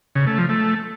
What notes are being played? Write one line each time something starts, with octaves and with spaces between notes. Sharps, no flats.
C#3
A3
F3
A3